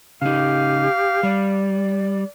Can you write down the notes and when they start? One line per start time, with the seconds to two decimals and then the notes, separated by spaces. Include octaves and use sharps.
0.22 C#3 D#4 G4 F5
1.23 G3 D5